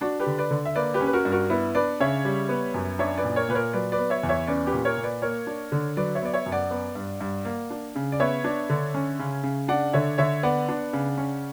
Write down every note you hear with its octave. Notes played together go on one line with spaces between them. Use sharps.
D4 F#4
G4 B4
D3
B4 D5
D3
E5
A#3 B4 D5
G4 B4
C#4
B4
F#4 A#4
G2
F#4 A#4
B3 E4
D4 B4 D5
C#3 C#5 E5
G3
B3
F#2
D4 C#5 E5
B4 D5
A#2
A#4 C#5
A#2 B4
A#4 C#5
F#3 B4 D5
B4 D5
B3
C#5 E5
E2
C#5 E5
C#4 B4 D5
G4 B4
A#2
A#4 C#5
A#2
B4 D5
A#3 A#4 C#5
D4
D3
F#3 B4 D5
C#5 E5
B3 D5
C#5 E5
F#2
D5 F#5
B3
G2
G2
A#3
D4
C#3
D5
B3 C#5 E5
D4
D3
C#4
C#3
C#3
D4 D5 F#5
D3 C#5 E5
D3 C#5 E5
B3 D5 F#5
D4
C#3
C#4